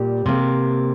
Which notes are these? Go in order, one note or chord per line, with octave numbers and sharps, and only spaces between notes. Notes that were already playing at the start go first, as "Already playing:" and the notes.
Already playing: A#2 G3
C3 A#3